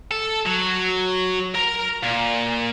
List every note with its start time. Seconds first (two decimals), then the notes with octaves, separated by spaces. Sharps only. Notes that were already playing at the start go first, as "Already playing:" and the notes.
0.11 A4
0.46 F#3
1.55 A#4 A#5
2.03 A#2